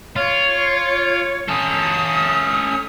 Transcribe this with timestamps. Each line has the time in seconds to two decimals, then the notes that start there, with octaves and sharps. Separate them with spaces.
0.16 F4 C#5
1.49 C#4 A4 D#6